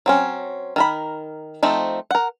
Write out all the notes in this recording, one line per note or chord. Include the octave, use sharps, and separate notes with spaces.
F#3 C4 C#4
D#3 A#4 B5
F3 A3 C4 D#4
A#4 F#5